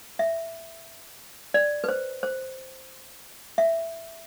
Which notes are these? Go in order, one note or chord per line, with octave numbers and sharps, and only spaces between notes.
E5
D5
B4
C5
C5
E5